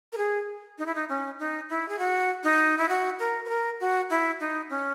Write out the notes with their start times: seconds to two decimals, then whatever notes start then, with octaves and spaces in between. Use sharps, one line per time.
0.13 A#4
0.17 G#4
0.78 D#4
0.86 E4
0.95 D#4
1.09 C#4
1.39 D#4
1.69 E4
1.88 G#4
1.99 F#4
2.44 D#4
2.78 E4
2.89 F#4
3.19 A#4
3.45 B4
3.49 A#4
3.80 F#4
4.10 E4
4.40 D#4
4.70 C#4